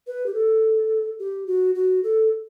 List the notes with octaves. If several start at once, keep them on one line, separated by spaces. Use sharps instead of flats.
B4
G4
A4
G4
F#4
F#4
A4